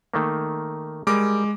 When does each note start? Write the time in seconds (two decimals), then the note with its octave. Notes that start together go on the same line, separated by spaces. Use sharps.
0.14 D#3 A3 A#3
1.07 G3 G#3 A#4 G#5 D6